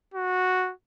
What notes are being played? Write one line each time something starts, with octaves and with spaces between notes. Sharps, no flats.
F#4